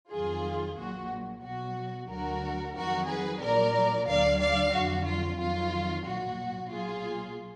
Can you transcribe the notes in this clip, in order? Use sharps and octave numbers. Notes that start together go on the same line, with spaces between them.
F2 D#3 F#3 F4 G#4
A#1 A#2 F#3 F#4
B1 B2 F#3 F#4
D2 D3 F#3 F#4 A#4
F2 D#3 F#3 F#4 A#4
G#4 B4
A#1 A#2 F#3 A#4 D5
D2 D3 F#3 D5 F5
D5 F5
F2 D3 F#3 F#4
F4
F2 D#3 F#3 F4
B1 A#2 F#3 F#4
B1 A#2 F#3 F4 G#4